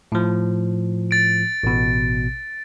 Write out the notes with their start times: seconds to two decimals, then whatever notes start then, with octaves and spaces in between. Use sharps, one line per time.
0.12 A2 F3
1.11 A6 D7
1.63 A1 B2